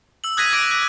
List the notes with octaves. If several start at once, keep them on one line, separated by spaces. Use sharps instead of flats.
E6 F#7
D#6 F#6 G#6 A#6 B6 D#7
D6 A#6 D7
F#6